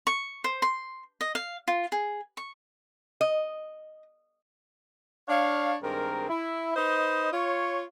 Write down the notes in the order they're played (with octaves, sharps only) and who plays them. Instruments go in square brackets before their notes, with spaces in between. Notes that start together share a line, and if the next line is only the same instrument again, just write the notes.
[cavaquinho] C#6
C5
C6
D#5
F5
F4
G#4
C#6
[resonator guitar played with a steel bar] D#5
[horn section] D4 C#5 F5
G2 D#3 G#3 C4 A#4
E4
D#4 B4 C5 D#5
F4 C#5